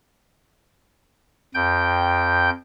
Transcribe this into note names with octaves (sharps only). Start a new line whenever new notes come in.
F2 G5 G6